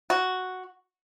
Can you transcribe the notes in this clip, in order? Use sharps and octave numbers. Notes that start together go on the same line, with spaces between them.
F#4